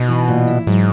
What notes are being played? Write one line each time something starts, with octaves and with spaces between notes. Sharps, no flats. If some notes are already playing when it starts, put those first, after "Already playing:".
Already playing: B2 D#4
E3
A#2
E4
G#2 F#3